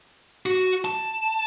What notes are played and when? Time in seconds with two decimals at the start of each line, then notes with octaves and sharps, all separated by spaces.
0.46 F#4
0.85 A5